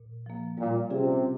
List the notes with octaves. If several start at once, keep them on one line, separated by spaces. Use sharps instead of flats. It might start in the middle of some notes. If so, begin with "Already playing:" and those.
Already playing: A#2
F3 A#3
A#2 G3
C3 C#4 F4 G#4